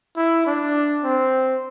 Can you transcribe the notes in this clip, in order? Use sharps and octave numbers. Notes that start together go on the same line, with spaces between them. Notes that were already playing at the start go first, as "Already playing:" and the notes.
E4
D4
C4